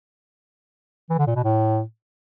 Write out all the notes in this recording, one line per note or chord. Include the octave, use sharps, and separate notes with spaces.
E3
D3
A#2
B2
A2